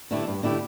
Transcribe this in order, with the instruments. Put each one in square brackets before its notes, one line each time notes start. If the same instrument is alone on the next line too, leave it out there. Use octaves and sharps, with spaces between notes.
[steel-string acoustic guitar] D3 A3 E4 G4
G2
D3 A3 E4 G4